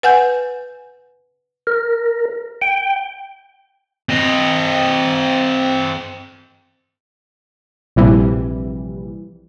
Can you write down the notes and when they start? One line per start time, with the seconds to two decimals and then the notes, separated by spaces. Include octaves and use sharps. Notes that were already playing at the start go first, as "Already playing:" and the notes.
0.03 B4 F#5 G#5 G6
1.67 A#4
2.62 G5
4.09 C4 D#5
7.96 A#1 C3 E3 G3